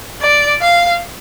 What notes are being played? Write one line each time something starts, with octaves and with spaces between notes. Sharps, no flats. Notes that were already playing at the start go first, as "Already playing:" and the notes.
D5
F5